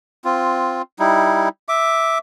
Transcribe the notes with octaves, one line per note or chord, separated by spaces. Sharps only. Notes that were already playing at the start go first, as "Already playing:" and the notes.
C4 F4
G3 D#4 E4
E5 D6